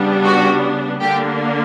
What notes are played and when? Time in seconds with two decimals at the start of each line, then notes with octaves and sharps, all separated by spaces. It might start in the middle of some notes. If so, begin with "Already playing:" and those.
Already playing: C#3 G3 B3 D4
0.25 F#4
1.01 D3 A#3 D4 G4